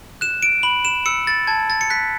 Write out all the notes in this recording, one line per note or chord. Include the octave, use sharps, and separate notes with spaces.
F#6 E7
D7
B5 F#7
E7
E6 C#7
A6
A5 G#6
A6
C#7
F#6 B6